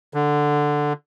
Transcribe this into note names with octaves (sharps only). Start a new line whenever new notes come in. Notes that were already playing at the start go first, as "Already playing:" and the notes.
D3